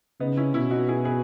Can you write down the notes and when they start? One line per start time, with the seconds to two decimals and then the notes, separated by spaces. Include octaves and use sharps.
0.20 C#3 B3 D#4
0.37 C#4 E4
0.54 B2 C#4 E4
0.71 D#4 F#4
0.89 E4 G#4
1.05 G#4 B4